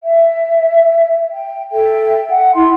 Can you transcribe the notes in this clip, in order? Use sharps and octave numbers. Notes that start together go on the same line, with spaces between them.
E5
G5
A4 E5 G5
F#5
E4 C6